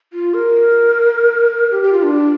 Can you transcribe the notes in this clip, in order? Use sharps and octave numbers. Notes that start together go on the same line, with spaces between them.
F4
A#4
G4
G4
F4
D4